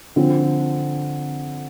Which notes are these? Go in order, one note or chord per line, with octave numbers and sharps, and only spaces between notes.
D3 F3 C4